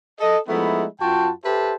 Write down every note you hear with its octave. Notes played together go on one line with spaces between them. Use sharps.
A4 D#5
F3 G#3 A3 B3 D#4 E4
F#2 F4 F#4 G5 A5
G4 A4 B4 C5 E5 A5